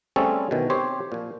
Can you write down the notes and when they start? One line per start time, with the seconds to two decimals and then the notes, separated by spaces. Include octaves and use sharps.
0.16 G3 A3 C4 C#4 G#4 A4
0.51 B2 D#3 E3
0.70 C4 G4 C5 C#5
1.12 A#2 F3